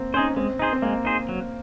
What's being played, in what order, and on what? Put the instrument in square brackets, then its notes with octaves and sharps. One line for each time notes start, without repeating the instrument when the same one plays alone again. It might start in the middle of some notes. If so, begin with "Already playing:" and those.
Already playing: [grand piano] A#3 C4
[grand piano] C#4 [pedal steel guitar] D#4 G#4 C5
[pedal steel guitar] G#3 [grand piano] C4
[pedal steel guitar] D#4 G#4 C5
[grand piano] C4
[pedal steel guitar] G#3 [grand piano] A#3
[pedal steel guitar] D#4 G#4 C5
F#3